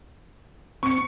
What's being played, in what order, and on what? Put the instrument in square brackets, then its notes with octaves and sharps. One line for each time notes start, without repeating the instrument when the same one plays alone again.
[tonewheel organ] C4 [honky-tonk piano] C#6 C#7